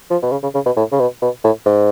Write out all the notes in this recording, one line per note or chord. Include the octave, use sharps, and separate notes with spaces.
F3
B2
C#3
C#3
C#3
B2
A2
C#3
B2
B2
A2
G#2